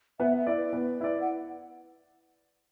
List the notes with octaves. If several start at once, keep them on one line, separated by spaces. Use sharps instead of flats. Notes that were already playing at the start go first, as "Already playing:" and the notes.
B3 E5
E5
E4 D5
B4
B3
E4 D5
F#5